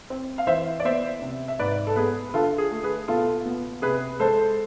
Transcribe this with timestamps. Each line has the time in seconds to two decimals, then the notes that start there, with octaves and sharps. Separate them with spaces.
0.10 C4
0.38 F5
0.47 E3 C5 E5
0.80 D5
0.85 B3 C5 E5
1.22 C3
1.48 E5
1.59 G#2 B4 D5
1.87 A4
1.96 B3 G#4 B4
2.29 B4
2.34 D3 F4 A4
2.58 G#4
2.71 A3
2.83 G#4 B4
3.08 B2 F4 A4
3.45 B3
3.82 C3 G#4 B4
4.20 G#3 A4 C5